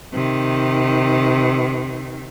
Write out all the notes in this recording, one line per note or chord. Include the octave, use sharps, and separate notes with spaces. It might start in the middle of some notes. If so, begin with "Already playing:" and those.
C3 D#3